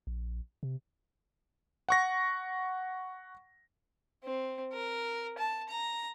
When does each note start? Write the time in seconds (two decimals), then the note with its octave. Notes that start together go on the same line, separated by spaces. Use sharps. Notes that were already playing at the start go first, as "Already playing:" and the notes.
0.07 A#1
0.63 C3
1.89 F#5 C#6 A#6
4.24 C4
4.73 A#4
5.38 A5
5.68 A#5